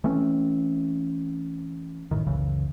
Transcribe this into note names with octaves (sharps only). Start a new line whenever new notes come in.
E3 A3 C4 C#4
F#1 B1 A2 D#3
F#1 C#2 C#3 E3